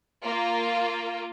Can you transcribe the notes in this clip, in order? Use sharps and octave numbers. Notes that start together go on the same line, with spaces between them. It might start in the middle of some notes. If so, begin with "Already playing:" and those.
A#3 F4